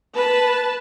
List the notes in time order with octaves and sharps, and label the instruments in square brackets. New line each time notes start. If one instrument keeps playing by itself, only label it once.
[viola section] B4 A5